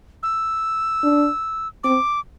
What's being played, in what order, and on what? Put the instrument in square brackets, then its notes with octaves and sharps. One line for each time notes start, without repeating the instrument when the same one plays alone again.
[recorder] E6
[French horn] D4
[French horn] C4 [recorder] D6